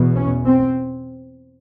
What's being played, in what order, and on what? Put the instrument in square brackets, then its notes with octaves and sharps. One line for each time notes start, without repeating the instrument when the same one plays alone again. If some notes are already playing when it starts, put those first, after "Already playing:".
Already playing: [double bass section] E2 B2
C#4
C4